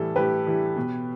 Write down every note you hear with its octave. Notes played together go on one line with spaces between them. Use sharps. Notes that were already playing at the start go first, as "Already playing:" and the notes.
Already playing: A2 E3 G3 A4
A2 G4 B4
E3 G3
B2